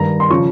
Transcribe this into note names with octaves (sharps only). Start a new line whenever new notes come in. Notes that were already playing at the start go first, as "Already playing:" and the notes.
Already playing: G2 D#3 A#5
C6
C#3 F3 C#6